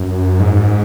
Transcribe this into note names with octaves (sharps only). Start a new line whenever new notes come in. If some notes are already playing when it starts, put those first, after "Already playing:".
Already playing: F#2
G#2